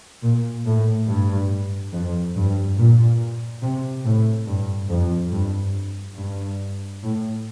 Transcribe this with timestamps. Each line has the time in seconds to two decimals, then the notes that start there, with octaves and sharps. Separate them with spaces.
0.23 A#2
0.65 A2
1.08 G2
1.93 F2
2.36 G2
2.77 A#2
3.62 C3
4.05 A2
4.47 G2
4.89 F2
5.32 G2
6.17 G2
7.02 A2